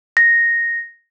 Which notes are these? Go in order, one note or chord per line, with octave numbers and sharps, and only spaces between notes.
A#6